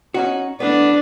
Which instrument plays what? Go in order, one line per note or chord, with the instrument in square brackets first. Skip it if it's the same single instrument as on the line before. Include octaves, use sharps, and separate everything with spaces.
[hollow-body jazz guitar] C#4 D#4 F#4
[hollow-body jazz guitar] E3 A3 B3 [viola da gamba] D4